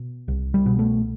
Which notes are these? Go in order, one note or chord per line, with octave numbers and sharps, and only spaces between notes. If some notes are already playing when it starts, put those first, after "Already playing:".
Already playing: B2
C2
G3
B2
A3